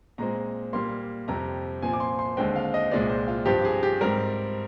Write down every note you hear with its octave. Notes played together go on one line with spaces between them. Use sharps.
A#2 G#3 C4 A#5
A#2 G3 A#3 C6
F2 C3 G3 C4 A#5
A#2 F3 C4 G#5
D6
C6
C6
D#2 D3 G#3 C4 G5
F5
D#5
C2 A#2 G#3 C4 D5
C5
F4
G2 F3 C4 G4
G#4
G4
G#2 G3 C4 A#4